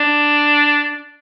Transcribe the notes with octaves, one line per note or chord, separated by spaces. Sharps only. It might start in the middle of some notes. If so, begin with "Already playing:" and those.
Already playing: D4